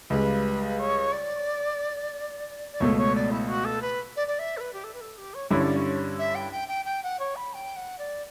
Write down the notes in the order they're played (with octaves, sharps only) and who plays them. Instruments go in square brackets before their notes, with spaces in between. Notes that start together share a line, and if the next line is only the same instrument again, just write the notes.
[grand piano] C#2 C#3 G3 [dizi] B4
[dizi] C#5
D5
D5
[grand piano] C#2 B2 A3 [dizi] C#5
[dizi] C#5
D5
E4
F#4
A4
B4
D5
D5
E5
A4
B4
G4
A4
B4
A4
G4
C#5
[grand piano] G2 D3 G3 C#4 E4 [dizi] C#5
[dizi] D5
C#5
E5
G5
G5
G5
G5
F#5
C#5
B5
G5
F#5
D5